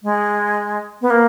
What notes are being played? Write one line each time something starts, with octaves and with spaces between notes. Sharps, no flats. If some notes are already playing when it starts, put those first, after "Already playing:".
G#3
B3
A#3